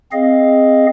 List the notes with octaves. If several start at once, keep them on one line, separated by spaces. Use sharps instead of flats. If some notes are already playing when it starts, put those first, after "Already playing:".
C4 G#4 D#5 F5